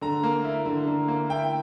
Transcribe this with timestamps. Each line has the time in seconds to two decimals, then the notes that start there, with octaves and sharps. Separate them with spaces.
0.01 D3 A#5
0.23 A#3
0.45 E4
0.66 D3
0.87 D3
1.08 A#3
1.30 E4 G5